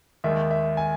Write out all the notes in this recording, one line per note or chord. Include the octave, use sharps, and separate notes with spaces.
D#2 D#3 G#3 E5
E5
G#5